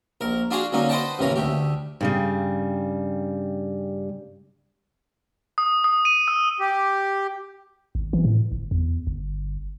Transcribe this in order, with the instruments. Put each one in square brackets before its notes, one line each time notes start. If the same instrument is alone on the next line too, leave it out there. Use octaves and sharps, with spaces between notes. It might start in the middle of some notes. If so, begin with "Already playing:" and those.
[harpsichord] A#1 A#4
D4 F4 F#4 G#4 F5 F#5
D3 F#3 A#3 C#4 D#4
B4 C5 D#5 F#5 G5 A5
A1 D#2 C#3 E3 C#4 A#5
D2 A3 G4
[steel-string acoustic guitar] G2 C#3 G3
[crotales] D#6
D#6
D#7
E6
[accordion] G4
[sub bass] G#1
E3
A2
G1
E2
G1